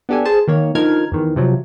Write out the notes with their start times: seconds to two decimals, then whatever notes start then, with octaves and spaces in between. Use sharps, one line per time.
0.09 B3 D4 G4 A4 G#5
0.25 G#4 C5 A5
0.48 D#3 A#3 C#5
0.75 D3 F3 D#4 A#4 F6 G#6
1.12 E2 D#3 E3
1.36 C3 F3 F#3